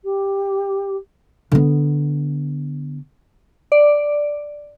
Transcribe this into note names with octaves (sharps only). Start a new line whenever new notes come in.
G4
D3 B3
D5